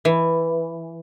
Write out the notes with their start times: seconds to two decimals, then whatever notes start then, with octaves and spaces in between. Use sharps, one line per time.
0.05 E3